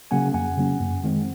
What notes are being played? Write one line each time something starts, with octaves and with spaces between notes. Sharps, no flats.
C#3 F#3 A#3 C#4 F#5 G#5
F2 F#5 G#5
C#3 F#3 A#3 C#4
F#2
D#3 G#3 C4